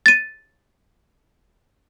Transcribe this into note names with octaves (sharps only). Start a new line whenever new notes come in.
A6 D#7